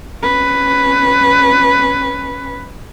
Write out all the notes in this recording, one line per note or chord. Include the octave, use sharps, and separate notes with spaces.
C#4 B4